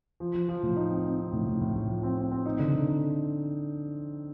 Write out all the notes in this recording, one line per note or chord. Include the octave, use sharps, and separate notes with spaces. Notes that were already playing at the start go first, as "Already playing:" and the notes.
F3
F3
F3
A2
D#4
C4
C4
D#4
A2
A2
A2
A2
F3
C4
C4
C4
D#4
D3
D3
D#4